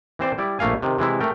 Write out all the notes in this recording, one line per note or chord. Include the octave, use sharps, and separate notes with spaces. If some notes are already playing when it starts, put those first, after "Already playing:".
E3 C4 C5 D5
G3 E4 D5
A#1 A3 A#3 F5 G#5
C3 D#3
C3 E3 G#3 E4
A3 A#4 G5